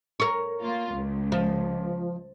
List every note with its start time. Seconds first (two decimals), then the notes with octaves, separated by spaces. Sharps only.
0.20 A#4 C#5
0.63 A#3 F4
0.94 C#2
1.32 F3